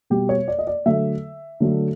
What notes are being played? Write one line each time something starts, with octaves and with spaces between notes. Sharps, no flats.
B2 G3 G4
C#5
D5
D#5
D5
D3 F#3 A3 E5
D3 F#3 A3